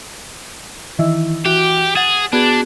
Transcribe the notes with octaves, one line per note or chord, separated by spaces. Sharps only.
D#3 E3 E4
E3 F#4 G4
G#4 F#5 A6 E7
B3 D4 F#4 G#4